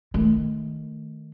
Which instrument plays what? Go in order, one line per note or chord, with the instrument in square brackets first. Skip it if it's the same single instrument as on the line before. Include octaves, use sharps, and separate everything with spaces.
[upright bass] D#3 A3